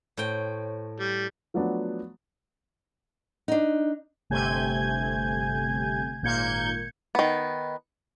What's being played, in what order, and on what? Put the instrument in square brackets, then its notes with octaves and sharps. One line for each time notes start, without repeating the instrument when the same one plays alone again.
[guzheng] A2 G5 [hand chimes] C5 C#5
[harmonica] G3
[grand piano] F3 F#3 A3 B3 D4
[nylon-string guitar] D4 D#4
[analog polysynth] G1 C3 A3 G#5 G6 G#6
G#1 A#2 A#3 G6 G#6 C#7
[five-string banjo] D#3 B3